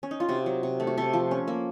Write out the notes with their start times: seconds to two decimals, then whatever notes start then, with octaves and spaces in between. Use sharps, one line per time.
0.03 C#4
0.11 D#4
0.20 F4
0.29 C3 F#4
0.46 F#3
0.63 C3
0.80 A3
0.87 F#4
0.97 C3 A4
1.13 F3
1.31 C#4
1.47 A#3